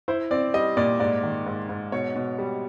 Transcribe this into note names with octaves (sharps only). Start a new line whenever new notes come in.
E4 C5
C4 D5
G3 D#5
A#2 D5
G#2 D5
D#3
G#2
G#2
B2 C#5
B2
G3